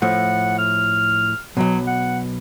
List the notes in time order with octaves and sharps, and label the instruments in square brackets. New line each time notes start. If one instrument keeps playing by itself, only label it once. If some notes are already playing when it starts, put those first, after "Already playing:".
[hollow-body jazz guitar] A2 F3 A3 [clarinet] F#5
[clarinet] F6
[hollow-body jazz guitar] B1 G#2 B2 [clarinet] F#3
[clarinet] F#5